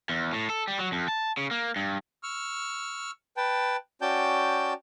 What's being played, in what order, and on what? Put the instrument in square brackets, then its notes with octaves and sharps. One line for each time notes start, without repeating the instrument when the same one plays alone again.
[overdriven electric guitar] E2
A2
A4
G3
F#3
F2
A5
C#3
A#3
G2
[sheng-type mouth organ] C#6 E6 F6
B4 G5 A5
C#4 F#4 D5 G5 A5 G6